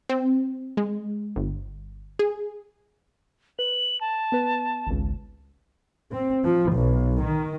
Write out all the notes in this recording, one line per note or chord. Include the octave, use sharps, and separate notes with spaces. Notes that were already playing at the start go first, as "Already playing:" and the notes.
C4
G#3
G1
G#4
B4 F#7
A5
B3 B4
G#1 C#2
C4
F3
B1
D#3